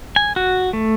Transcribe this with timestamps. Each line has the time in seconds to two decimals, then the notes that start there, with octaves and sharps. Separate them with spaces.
0.16 G#5
0.36 F#4
0.73 A3